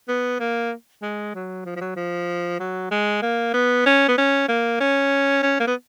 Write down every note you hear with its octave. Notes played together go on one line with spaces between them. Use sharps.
B3
A#3
G#3
F#3
F3
F3
F#3
F3
F#3
G#3
A#3
B3
C#4
B3
C#4
A#3
C#4
C#4
A#3
B3